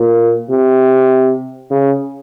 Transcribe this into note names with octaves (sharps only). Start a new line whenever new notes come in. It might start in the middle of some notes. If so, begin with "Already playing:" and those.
Already playing: A#2
C3
C#3